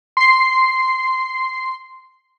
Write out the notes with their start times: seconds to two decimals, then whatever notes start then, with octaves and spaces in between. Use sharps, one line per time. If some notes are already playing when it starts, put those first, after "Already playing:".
0.17 C6 C7